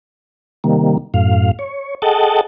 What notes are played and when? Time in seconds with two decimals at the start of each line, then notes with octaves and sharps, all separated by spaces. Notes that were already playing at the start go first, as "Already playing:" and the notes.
0.64 C3 D#3 G3 A#3
1.14 F#2 A2 F5
1.59 C#5
2.02 G#4 A4 D#5 F#5 G5 A5